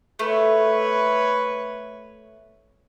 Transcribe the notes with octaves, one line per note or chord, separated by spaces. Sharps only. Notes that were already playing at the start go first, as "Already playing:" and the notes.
A3 B4 C#5